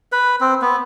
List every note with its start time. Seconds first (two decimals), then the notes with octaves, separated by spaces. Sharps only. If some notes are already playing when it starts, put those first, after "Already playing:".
0.12 B4
0.40 C4
0.61 B3